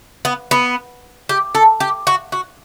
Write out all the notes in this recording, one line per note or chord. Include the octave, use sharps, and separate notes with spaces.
B3
B3
G4
A4
G4
F#4
F#4